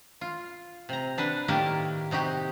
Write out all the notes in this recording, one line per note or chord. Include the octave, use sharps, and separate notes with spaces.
F4
C3 A#5
D4 B4 F#5
A2 D#3 A#3 G4 A#4 D5
C3 D#4 F#4 G4